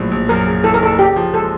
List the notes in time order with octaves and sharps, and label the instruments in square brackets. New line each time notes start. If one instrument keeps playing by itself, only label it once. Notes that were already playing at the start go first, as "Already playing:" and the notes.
Already playing: [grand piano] A#1 A2 F#3
A#1
[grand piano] F#2 [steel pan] A#4
[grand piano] C#3
[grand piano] E3 [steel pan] A4
[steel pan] A#4
[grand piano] F#1 [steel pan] A4
[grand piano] C#3 [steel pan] G4
[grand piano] F3
[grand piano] G#3 [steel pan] A4